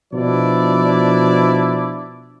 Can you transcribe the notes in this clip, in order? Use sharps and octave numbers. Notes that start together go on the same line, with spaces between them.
B2 F3 D4 E4 D5